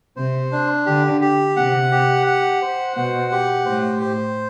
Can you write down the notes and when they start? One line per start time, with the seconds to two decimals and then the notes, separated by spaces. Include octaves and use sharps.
0.16 C3 C5
0.52 D4
0.86 D3 G4
1.21 G4
1.56 C3 F#5
1.92 G4
2.27 F#5
2.62 C5
2.96 B2 F#5
3.31 G4
3.65 A2 C5
4.01 C5